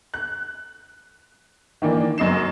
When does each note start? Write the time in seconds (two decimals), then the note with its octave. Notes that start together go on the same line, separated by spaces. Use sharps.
0.14 F#6
1.82 D#3 E3 A#3 D4
2.18 F#1 F#2 D#5 C7 E7